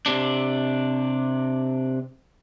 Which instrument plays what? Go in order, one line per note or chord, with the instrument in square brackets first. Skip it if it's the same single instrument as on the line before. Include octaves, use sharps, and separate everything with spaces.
[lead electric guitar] C3 D4